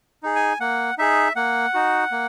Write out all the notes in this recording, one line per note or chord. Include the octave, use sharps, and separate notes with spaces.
D#4 G#4
G#5
A#3 F#5
D#4 G#4 E5
A#3 F#5
D#4 F#4
A#3